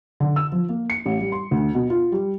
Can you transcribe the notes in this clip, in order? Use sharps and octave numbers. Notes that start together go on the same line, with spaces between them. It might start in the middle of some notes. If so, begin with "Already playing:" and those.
D3
E6
F3
A#3
C#7
A1
G3
C6
D2
B2
F4
G3